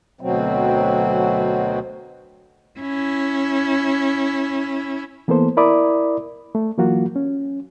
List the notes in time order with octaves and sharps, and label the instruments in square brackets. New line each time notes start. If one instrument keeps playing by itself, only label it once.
[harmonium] D2 B2 F#3 C4
[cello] C#4 E4
[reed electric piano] E3 A#3 B3 A4 C5
E4 A#4 D5 B5 D6 D#6
A3
E3 F#3 A#3 F4 F#4
C#4